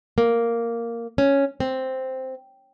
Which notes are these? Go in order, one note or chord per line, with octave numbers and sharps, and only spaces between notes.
A#3
C#4
C4